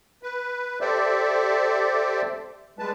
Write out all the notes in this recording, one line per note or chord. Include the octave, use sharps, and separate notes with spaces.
B4
G4 A4 C5 D5 E5
G3 G#3 B4 A5